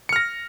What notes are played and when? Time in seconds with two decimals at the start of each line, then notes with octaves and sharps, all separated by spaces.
0.09 C#7
0.13 F6
0.16 A#6